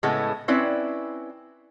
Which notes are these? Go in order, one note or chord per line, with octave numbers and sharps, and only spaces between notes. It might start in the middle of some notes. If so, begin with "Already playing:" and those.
A2 C#3 G#3 A3 B3 E4
C4 C#4 E4 B4 D5